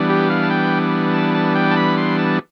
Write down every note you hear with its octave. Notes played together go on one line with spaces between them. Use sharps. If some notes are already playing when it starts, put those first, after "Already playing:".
Already playing: E3 G3 B3 D4
G4
F5
A5
G5
A5
A5
G5
A5
B5
C6
A5